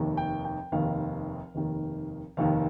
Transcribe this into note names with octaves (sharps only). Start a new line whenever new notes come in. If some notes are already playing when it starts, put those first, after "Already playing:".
Already playing: F1 D#2 D#3
G5
G5
F1 D#2 D#3 F5
F1 D#2 D#3
F1 D#2 D#3 F5